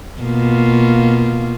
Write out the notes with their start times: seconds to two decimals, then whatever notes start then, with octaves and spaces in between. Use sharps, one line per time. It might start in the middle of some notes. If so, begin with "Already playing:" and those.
0.22 B2 A#3 F4